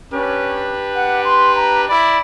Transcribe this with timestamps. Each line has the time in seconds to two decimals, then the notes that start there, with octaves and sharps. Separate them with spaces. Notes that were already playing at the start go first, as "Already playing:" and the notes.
0.11 C#4 D4 G4 B4
0.95 F#5
1.25 C6
1.56 A#5
1.89 E4 D5 B5